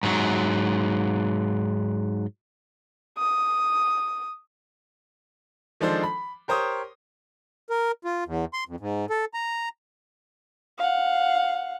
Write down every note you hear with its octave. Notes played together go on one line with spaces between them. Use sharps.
G#2 F#3
D#6
D#3 F3 G#3 D4 A4 C5
B5
G4 A#4 C5 C#5 D#6
A#4
F4
E2
C6
F2
G#2
A4
A#5
F5 F#5